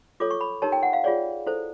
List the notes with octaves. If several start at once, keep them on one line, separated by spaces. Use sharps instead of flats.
F4 A4 C#5 D6
C#6
B5
D#4 G4 A#4 C#5 A5
G5
F#5
F5
F4 G#4 C#5 D5
E4 A4 C5